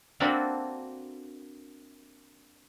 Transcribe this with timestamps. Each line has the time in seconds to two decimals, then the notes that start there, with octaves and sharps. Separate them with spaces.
0.20 A#3 C4 D4 F#4 A4 B5